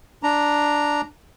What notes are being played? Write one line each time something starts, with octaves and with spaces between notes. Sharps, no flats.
D4 A#5